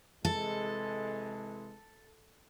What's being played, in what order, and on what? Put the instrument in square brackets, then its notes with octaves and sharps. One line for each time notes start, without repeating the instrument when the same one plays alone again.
[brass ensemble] C3 E3 G#3 [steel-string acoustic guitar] A4